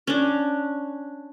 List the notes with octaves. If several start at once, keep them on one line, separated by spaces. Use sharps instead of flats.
C#4 D4